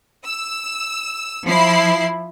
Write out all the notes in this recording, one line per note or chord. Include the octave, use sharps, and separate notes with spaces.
E6
F3 E4 C7